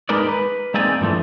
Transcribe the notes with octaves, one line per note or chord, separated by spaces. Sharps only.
G#3 D#4 A#4 B4 D5
B4
G#3 A#3 C4 D#4 D5 G#5
G2 E3 F3 A3